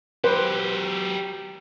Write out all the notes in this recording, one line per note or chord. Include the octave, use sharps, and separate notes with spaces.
F#3 G4 B4 C5